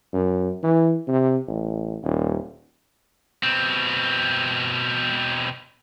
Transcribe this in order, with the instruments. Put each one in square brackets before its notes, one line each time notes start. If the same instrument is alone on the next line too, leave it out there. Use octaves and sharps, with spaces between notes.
[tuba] F#2
E3
C3
A1
D#1
[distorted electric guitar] B2 C4